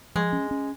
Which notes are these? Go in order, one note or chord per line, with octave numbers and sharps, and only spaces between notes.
F3 G#3
C#4
C#4